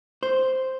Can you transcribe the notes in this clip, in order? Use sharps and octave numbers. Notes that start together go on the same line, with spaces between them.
C5